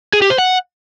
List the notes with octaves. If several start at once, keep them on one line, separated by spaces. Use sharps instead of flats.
G#4
G4
C5
F#5